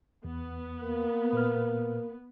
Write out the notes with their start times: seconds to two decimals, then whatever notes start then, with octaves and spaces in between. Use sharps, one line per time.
0.25 E2 B3
0.81 A#3
1.33 A#2 B4 F6